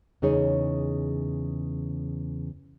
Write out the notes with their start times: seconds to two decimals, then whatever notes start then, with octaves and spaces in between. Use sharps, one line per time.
0.22 E2 C#3 D#4 G#4 C#5